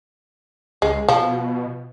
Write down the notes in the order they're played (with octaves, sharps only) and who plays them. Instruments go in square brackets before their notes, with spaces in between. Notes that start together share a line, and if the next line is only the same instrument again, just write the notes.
[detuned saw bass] C#2 [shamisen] G#3
[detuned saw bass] B2 [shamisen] F3